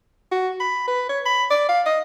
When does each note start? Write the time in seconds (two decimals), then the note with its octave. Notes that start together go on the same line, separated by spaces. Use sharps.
0.32 F#4
0.60 B5
0.88 B4
1.09 C#5
1.26 B5
1.51 D5
1.69 F5
1.86 D#5